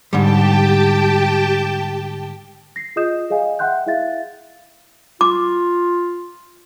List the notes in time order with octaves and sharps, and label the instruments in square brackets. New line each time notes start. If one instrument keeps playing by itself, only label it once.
[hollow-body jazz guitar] G#2 D3 G3 [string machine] G4 G5 A5
[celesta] A#6 C7
F4 G#4 D#5 D#6 G6 E7
G#4 D#5 F5 G#5
E5 F#5 G5 C6 F#6 G6
E4 G#4 E5 F5 A6
[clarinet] F4 [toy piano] D6